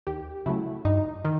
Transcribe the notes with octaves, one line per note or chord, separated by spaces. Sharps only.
D#2 G4
C#3 F#3 A3 E4
G2 D#4
D#3